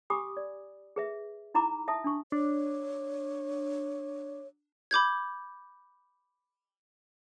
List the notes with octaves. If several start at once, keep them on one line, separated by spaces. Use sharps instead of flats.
G4 G#5 B5 D6 D#6
D5
G#4 B4 E5
D#4 E4 A#5 B5 D6
E5 A5 D#6
D4 C#6
D4 C#5
B5 D6 G6 G#6